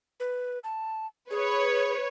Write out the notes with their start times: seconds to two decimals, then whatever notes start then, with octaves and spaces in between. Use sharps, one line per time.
0.20 B4
0.64 A5
1.31 G#4 B4 C#5